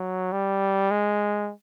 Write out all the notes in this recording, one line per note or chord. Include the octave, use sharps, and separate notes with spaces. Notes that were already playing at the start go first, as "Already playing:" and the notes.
Already playing: F#3
G3
G#3